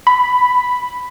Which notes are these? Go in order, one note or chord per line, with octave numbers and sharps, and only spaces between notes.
B5